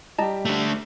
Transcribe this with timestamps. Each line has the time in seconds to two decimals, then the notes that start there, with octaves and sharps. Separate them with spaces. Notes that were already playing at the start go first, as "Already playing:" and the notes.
0.18 G3 G4 D#5 A5 A#5
0.45 A3 D4